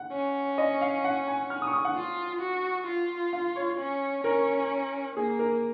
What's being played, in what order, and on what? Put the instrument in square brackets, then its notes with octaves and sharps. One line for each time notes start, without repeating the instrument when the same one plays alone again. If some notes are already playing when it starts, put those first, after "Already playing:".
Already playing: [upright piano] F#5
[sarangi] C#4
[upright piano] D#5
F5
F#5
G#5
F6
D#6
C#6
D#6
F#5
[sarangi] F4
F#4
F4
[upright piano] F5
C#5
[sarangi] C#4
[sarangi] C#4 [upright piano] A#4
[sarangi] A#3 [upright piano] G#4
[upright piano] A#4